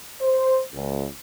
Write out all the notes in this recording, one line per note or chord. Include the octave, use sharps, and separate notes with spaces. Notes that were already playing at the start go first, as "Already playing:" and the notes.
C5
C#2